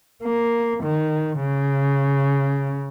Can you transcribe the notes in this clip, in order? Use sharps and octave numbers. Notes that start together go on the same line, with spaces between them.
A#3
D#3
C#3